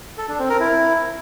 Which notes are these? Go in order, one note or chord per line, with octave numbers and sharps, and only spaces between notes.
A4
D4
C4
A#4
E4